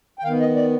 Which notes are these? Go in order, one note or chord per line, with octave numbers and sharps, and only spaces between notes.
G5
D#3 B3 F5
D#5
D5